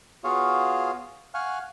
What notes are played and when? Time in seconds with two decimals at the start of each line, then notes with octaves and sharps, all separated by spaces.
0.24 B3 F4 F#4 G#4 C#5 F5
1.34 F5 F#5 G#5 C#6 F6 F#6